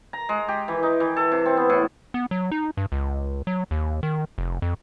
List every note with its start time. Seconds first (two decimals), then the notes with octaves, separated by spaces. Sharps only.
0.13 A#5
0.29 G#3
0.48 G4
0.68 E3
0.83 D#4
1.00 E3
1.16 A4
1.32 C3
1.46 C4
1.57 B3
1.70 A2
2.14 B3
2.31 F#3
2.51 D#4
2.77 G2
2.92 C#2
3.47 F#3
3.71 D#2
4.03 D#3
4.38 F1
4.62 F2